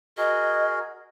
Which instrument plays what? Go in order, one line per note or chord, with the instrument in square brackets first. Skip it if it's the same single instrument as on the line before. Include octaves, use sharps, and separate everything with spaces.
[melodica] F#4 G#4 A#4 [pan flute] D#5